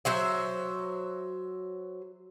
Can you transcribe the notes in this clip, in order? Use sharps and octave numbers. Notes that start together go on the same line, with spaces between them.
F#3 C5 E5